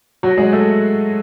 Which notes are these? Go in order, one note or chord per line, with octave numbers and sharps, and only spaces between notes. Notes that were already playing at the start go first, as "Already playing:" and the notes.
F#3 F#4
G#3 G#4
A3 A4